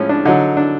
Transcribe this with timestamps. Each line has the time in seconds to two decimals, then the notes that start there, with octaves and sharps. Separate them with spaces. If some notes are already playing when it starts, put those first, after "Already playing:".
Already playing: A2 F3 G#3 C#4
0.09 D4
0.25 D3 F#3 D#4
0.57 D4